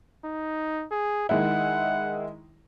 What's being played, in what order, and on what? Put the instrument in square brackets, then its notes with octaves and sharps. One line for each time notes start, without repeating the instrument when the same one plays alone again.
[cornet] D#4
G#4
[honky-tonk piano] D#3 G#3 E4 [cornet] F#5